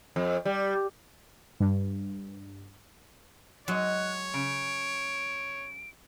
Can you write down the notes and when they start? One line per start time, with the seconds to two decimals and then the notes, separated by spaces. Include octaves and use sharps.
0.16 F2
0.45 G3
1.60 G2
3.68 F#3 G#3 C#5 D#5 F#6
4.34 C#3 D7